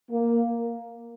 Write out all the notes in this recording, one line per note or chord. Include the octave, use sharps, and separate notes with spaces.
A#3